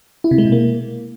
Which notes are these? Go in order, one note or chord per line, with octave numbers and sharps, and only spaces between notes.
E4
C3
G#3
B2
A#3